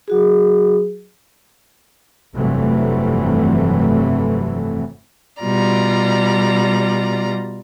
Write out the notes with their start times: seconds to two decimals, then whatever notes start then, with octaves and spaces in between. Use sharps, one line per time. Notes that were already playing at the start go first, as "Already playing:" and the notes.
0.08 F#3 F#4 G#4
2.35 F1 G2 C3 E3 F#3 A3
5.42 B2 G3 F4 D5 A#5